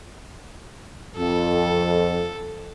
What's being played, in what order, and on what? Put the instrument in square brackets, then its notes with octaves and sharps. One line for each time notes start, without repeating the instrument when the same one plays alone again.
[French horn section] F2 [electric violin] A4